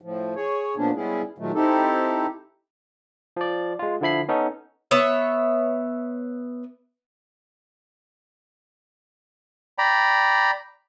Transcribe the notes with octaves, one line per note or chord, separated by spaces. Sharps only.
A2 F3
G#4 C#5
A#2 F3 A#3 B3 C#4 D4
G3 G#3 B3 C#4 E4 G#4
A#2 D#3 F#3 G#3 A3
C4 D#4 E4 G4 A4
F3 D5
G#3 F4
D3 F3 E4 B5 C7
B3 C#4 D#4 A4
B3 C#5 E5
D5 G5 A#5 B5